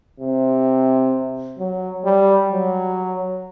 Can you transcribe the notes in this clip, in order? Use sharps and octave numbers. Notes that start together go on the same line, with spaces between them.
C3
F#3
G3
F#3